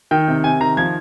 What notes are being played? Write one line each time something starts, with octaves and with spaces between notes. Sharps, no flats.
D#3 G5
C3
C3 G#5
D#3 A#5
F3 G#6